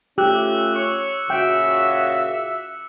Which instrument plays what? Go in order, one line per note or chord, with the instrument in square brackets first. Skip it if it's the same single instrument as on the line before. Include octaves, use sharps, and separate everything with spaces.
[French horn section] A3 C#4 F4 [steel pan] G4 [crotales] D6 E6 F#6
[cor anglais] C#5 [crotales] E6 C#7
[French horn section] A#2 C#3 F#4 [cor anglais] E5 [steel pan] G5